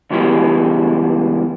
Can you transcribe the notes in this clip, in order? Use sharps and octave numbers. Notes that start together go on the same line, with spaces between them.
C#2 F#2 B2 E3 G3 G#3